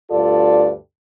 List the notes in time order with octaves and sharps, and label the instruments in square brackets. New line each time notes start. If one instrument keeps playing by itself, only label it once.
[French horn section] D2 G2 F4 A4 D5